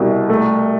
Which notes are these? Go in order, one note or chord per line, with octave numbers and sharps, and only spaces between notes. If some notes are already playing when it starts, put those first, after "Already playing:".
Already playing: C2 B2
A3